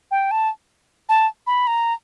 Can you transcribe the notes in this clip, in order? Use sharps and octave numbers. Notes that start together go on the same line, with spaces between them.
G5
A5
A5
B5
A#5